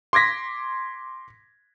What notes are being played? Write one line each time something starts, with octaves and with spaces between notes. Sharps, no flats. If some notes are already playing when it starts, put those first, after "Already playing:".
C6 D6 G#6 A#6 B6